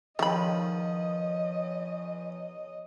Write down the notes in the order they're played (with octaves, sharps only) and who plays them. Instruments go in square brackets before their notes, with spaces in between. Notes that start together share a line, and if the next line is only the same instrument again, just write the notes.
[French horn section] E2 C#5 [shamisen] D#3 B5 [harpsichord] F3 [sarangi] D#5